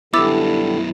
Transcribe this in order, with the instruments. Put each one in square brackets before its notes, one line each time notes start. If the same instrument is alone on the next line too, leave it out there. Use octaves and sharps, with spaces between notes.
[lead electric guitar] F#2 B3 [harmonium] D3 G3 [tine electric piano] E4 [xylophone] D6 E6 A6